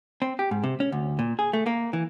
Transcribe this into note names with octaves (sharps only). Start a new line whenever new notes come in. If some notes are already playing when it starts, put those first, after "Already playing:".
C4
G4
G#2
C3
C#4
D2
A#2
G#4
A3
A#3
E3